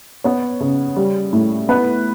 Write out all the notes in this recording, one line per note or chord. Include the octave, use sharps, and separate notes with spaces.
B3 C#5
C#3
G3
A2
B3 B4